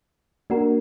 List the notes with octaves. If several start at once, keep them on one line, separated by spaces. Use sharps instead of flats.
A#3 D4 F#4 A#4